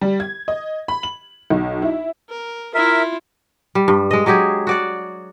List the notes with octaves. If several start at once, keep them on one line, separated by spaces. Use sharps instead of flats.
G3
G#6
D#5
B5
F#7
B1
E4
A#4
E4 F4 A#4 E5
G3
G2
G#3 D#5
F#3 G#3 G4 G#4
F#4 D5 F#5